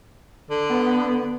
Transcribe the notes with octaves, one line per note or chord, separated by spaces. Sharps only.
D3
B3